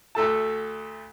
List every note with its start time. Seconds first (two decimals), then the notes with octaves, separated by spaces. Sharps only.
0.15 D2 A3 A4 A5